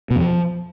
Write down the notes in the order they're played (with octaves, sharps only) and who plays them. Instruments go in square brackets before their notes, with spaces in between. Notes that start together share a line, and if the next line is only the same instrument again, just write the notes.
[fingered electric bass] B2
F2
F3